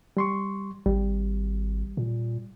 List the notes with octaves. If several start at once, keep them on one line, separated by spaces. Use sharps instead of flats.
G3 C6 C#6
G#1 G3
A#2